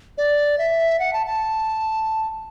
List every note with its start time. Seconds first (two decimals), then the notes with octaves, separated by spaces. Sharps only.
0.18 D5
0.58 E5
0.99 F#5
1.13 A5
1.27 A5